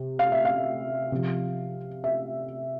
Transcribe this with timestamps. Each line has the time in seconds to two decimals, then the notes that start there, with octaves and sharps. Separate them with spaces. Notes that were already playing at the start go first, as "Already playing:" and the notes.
Already playing: C3
0.19 F5
0.32 E5
0.45 F5
1.12 C3 F3
2.04 E5